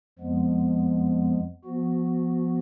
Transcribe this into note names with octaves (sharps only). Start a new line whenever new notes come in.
F2 F3 G#3 B3
F3 B3 F#4